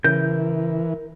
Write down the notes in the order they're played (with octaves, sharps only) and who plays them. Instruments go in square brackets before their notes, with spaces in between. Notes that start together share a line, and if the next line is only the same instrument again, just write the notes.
[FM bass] C#3 [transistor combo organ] E3 [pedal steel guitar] A#4 G6